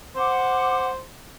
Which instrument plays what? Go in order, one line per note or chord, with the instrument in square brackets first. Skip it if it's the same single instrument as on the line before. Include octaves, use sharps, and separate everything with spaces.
[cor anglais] C5 [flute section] F#5 D6